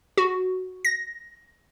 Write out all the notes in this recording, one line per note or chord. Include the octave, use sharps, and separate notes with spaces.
F#4
A#6